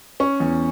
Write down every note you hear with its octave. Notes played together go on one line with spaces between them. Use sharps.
C#4 C#6
E2